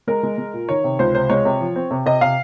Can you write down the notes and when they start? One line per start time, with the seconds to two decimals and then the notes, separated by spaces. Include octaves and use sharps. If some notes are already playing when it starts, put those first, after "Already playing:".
0.07 G#3 A#4
0.23 G#3
0.38 G#3
0.53 A#2
0.69 D#3 C#5
0.84 C3
0.99 C#2 C5
1.15 C3 C5
1.30 G#3 C#5
1.45 C3
1.61 F3
1.76 C4
1.91 C3
2.06 C3 D#5
2.21 C3 F5